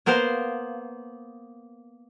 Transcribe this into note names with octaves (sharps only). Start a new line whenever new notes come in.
A#3 B3 A#4 C5 F5